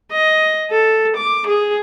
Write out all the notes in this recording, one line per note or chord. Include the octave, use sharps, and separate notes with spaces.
D#5
A4
D6
G#4